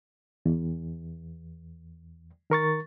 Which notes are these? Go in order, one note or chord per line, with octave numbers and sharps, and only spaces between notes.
E2
D#3 A#4 C#6 A6